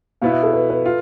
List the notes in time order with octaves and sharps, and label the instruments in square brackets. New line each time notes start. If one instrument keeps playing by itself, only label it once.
[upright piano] B2 B3 E4 [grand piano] F5
[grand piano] E5
A4
B4
B4
[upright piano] F4